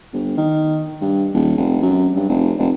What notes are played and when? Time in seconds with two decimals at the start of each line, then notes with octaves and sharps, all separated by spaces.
0.13 G1
0.37 D#3
1.01 G2
1.34 D#1
1.57 F1
1.82 F#2
2.16 G2
2.29 F1
2.58 F1